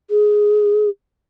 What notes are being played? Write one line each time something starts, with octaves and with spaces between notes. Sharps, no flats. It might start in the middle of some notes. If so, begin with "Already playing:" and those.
G#4